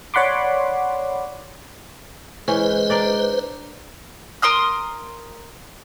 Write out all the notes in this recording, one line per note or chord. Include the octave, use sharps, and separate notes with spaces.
C#5 D5 F#5 B5 C6 D6
E3 G#3 C#4 B4 C5
D4 A#4 D5
A#4 C6 D#6 F6